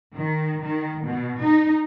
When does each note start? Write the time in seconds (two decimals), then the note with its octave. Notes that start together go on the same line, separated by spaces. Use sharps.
0.17 D#3
0.62 D#3
1.03 B2
1.41 D#4